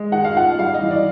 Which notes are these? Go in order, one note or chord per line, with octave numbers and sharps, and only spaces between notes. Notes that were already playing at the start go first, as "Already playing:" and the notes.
Already playing: G#3
D#3 F#5
F5
F4 F#5
G3 F5
D#5
E3
D5